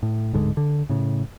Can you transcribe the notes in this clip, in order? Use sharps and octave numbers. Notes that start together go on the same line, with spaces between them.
A2
D1 G#2 D3 G#3
D3
A2 C#3